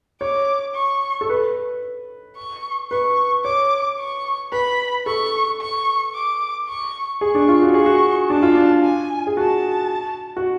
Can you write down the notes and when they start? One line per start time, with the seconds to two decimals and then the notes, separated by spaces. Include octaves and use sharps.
0.21 C#5 D6
0.75 C#6
1.21 A4
1.29 B4
2.36 C#6
2.91 B4 C#6
3.44 C#5 D6
3.99 C#6
4.52 B4 B5
5.06 A4 C#6
5.61 C#6
6.14 D6
6.68 C#6
7.21 G#4 C#6
7.35 D4
7.48 F4
7.62 F#4
7.74 G#4 C#6
7.86 F#4
8.29 D4 A5
8.43 F4
8.55 D4
8.83 G#5
9.27 G#4
9.37 F#4 A5
10.37 F#4